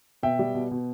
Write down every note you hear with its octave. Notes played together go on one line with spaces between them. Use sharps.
B2 E5 G5
G3
B2
B2